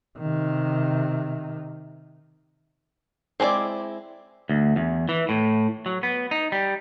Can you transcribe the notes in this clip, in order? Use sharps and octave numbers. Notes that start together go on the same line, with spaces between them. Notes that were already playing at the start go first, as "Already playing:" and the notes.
C3 D#3
G#3 C4 D4 E4 D5
D2
E2
E3
A2
F#3
B3
D#4
G3